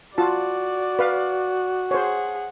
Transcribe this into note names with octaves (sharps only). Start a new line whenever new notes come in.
F4 F#4 D5 A5
B4 F5
G#4 C5 C#5 F#5